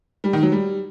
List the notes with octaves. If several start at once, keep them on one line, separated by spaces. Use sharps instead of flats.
G3
D#3
F#3
G3